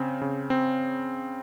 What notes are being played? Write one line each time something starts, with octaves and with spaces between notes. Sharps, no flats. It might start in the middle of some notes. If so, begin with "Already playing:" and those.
Already playing: C#3 C4
C#3
C4